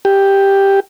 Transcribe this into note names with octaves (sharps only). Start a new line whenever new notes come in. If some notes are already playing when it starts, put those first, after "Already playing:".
G4